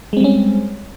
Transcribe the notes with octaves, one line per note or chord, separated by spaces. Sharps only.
G3 G#3 C4 C#4